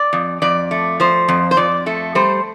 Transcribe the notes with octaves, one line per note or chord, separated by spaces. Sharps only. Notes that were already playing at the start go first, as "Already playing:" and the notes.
Already playing: D5
F2
F2 D5
A3
F3 C5
F2
C5
F2 D5
A3 A4
G3 C5